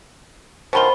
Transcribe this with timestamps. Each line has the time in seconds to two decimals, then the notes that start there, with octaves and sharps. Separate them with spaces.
0.73 B2 D#3 F4 C5 B5 G7